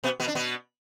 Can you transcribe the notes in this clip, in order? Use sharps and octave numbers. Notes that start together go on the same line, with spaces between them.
B2 B3
B2 B3
D4
B2 B3